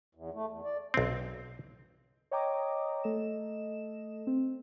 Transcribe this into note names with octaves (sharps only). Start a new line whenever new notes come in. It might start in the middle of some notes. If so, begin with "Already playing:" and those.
E2
A3
E2
D5
B1 C4
C#5 D#5 G5 A#5 D6 D#6
A3 A4 D#5 E7
C4